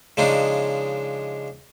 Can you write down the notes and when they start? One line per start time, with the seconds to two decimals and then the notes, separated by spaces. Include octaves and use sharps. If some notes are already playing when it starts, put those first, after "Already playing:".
0.17 C#3 F3 G#3 D4 D#4